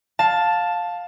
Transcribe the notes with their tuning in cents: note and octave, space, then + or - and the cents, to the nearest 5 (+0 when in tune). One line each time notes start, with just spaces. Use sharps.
F5 +15 A5 +0